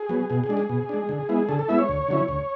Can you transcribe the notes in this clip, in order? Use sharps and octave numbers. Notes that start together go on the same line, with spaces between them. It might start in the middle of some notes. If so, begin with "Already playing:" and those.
Already playing: G#4
F#3 B3
B2 G#4
G#4
G#3 D4
G#4
B2
G#3 D4
D3
G#3 B3 E4
D3 A4
A4
G#3 B3 E4 E5
C#5
D2
D3 F#3 C#4 E4
D2